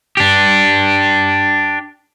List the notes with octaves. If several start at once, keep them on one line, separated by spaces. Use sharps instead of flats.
D4 G4